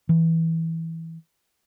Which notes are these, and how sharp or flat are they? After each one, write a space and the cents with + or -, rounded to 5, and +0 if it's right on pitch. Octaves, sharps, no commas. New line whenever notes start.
E3 -10